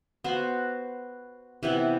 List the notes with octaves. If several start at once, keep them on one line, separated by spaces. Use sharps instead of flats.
B3 F#4 C5
C3 E3 B3 E4